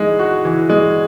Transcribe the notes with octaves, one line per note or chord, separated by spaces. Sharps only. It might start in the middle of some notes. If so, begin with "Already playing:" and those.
Already playing: E3 G#3 D#4
F#4
E3
G#3